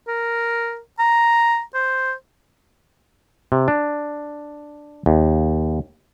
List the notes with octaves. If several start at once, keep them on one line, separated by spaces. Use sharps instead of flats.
A#4
A#5
C5
C3
D4
D#2